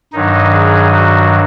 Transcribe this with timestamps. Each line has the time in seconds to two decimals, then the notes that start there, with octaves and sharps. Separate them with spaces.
0.12 G2 D#3 F#3 D#4
0.52 G#4
0.91 F#4